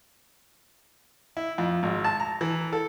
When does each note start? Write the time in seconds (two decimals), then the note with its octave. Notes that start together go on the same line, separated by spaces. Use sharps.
1.37 E4
1.58 F2
1.83 G#1
2.04 A5
2.20 A#5
2.41 E3
2.73 A4